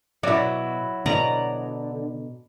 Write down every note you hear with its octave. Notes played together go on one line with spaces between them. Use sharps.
B2 F#3 E4 D5
B2 D3 D5 D#5 A#5